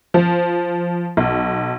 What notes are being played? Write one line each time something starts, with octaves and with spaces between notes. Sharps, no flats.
F3
B1